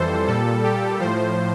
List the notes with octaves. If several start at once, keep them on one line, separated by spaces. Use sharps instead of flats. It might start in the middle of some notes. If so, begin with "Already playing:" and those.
Already playing: F2 E3 G3 A4 C5
A#2 G3 A4
G4
A2 F3 C5